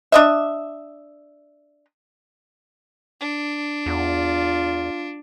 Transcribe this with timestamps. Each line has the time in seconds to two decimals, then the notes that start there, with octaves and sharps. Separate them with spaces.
0.12 D4 D#5 E5
3.20 D4
3.86 E2 F4